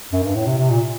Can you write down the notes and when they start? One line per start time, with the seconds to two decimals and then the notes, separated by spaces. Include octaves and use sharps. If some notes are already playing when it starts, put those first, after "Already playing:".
0.13 F#2
0.24 G2
0.35 A2
0.47 C3
0.58 C3
0.70 A#2